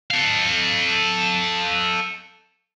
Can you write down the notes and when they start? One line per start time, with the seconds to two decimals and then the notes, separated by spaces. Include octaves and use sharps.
0.11 A4 F5